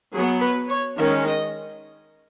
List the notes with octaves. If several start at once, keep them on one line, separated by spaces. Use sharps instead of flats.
F#3 B3 G#4
B4
C#5
D#3 G#3 C#4 E5
D#5